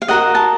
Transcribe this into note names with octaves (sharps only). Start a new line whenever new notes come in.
F5
F#4 A#4 D#5 F#5
A5